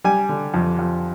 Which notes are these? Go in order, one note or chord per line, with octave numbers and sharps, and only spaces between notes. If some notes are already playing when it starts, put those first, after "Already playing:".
G3 G#5
D3
F2
F2